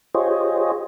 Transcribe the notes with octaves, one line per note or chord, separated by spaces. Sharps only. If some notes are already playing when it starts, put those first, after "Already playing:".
F4 G4 G#4 C5 C#5 D#5